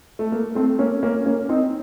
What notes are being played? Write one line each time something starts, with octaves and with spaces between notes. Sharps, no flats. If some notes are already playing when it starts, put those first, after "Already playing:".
A3
A#3
A3 C4
A#3 C#4
A#3 C#4
A#3 C#4
C4 D#4